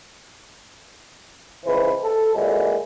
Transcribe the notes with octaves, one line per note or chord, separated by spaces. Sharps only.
C#2 E3 B4 C5
A4
A#2 D3 E3 F#3 G#3